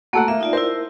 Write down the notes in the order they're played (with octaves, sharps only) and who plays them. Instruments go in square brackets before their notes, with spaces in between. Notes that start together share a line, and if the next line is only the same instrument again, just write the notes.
[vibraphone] A3 A#3 [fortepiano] F#4 A4 F#5
[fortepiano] A#3 [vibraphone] E5
[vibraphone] D#4 F4 D5
[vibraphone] E4 A#4 [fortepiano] C5